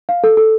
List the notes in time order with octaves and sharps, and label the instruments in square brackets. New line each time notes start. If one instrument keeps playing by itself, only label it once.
[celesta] F5
A4
A4